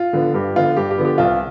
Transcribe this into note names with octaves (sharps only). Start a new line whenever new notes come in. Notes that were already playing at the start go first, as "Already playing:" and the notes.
Already playing: F4
D3 F3 B3
G2 G4
D3 F3 B3 F4
G2 G4
G4
D3 F3 B3
G4
C2 F4